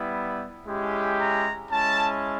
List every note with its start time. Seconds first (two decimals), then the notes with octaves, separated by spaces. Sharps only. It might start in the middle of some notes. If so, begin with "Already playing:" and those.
Already playing: G3 B3 E4
0.65 G#3 C#4 E4 G4
1.19 A#5
1.71 G#3 C#4 E4 A5